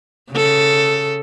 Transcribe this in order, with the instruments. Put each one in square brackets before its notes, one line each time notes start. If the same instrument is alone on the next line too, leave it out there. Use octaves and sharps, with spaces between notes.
[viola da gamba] C#3 A4